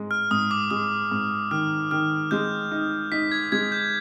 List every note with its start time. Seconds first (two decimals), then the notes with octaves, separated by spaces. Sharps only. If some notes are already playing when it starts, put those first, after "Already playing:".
Already playing: G#2 G#3
0.11 F6
0.31 G#2 D#6
0.51 D6
0.71 G#3 D#6
1.11 G#2
1.51 D#3 F6
1.91 D#3 F6
2.31 G#3 G6
2.71 D#4
3.12 D#4 B6
3.32 G#6
3.52 G#3 G#6
3.72 G6